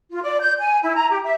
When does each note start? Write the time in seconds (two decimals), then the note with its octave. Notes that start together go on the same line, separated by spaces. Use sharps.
0.11 F4
0.23 D5
0.40 G6
0.60 G#5
0.82 E4
0.95 A#5
1.10 G4
1.24 E5